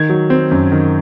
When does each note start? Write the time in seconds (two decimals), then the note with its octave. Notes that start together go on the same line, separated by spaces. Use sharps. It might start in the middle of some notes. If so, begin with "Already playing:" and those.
Already playing: D#3 G#6
0.09 F#3
0.30 C4
0.51 F#2
0.72 D#3